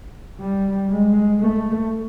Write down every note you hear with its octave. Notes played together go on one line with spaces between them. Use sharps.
G3
G#3
A3